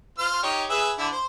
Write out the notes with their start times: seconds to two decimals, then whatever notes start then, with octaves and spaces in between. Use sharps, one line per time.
0.18 F4 C5 F6
0.43 D#4 G4 C#5
0.69 G#4 B4 E5
0.98 D3 E4
1.12 C5